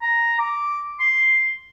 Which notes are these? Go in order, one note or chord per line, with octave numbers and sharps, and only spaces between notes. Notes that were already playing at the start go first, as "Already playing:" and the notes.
A#5
D6
C6